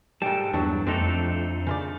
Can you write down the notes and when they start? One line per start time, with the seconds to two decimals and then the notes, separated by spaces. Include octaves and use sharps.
0.22 G#2 G3 A4 G5 A5
0.53 E2 G2 F#3 D4
0.87 F2 A3 C4 D4 D#4 A4
1.67 C#3 C5 D5